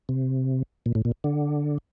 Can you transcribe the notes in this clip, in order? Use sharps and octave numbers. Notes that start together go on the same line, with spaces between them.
C3
A#2
A2
A#2
D3